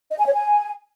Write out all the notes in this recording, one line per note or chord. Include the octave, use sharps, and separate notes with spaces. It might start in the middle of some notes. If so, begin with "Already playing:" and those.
D#5
G#5
C#5
G#5